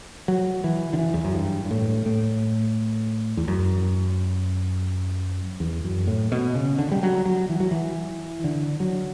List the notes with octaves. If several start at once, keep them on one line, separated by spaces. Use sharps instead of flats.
F#3
E3
D3
E3
E2
F#2
G2
G2
A2
A2
E2
F#2
E2
F#2
A2
B2
C#3
D3
G3
F#3
F#3
E3
F#3
E3
D3
F#3